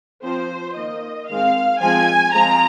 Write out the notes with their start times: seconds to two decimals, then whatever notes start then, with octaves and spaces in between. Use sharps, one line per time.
0.23 F3 C4 C5
0.76 D#3 A#3 D#5
1.28 D#3 G#3 C4 F5
1.81 F3 G#3 C4 G#5
2.34 F3 G#3 C4 A#5